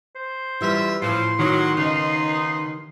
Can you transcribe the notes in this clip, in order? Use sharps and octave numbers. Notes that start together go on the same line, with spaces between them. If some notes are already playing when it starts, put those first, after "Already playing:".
C5
F#2 E3 G3 F4 E5
A2 C#3 E3 F3 C6
D#3 F#3
D#2 C#3 B3 D#4 D#5